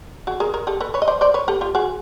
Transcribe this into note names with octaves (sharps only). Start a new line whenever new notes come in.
F#4 G#4
G#4 A#4
G#4 A#4
G4 A4
A4 B4
B4 C#5
D#5
C5 D5
C5 D5
B4 C#5
G4 A4
F4 G4
F#4 G#4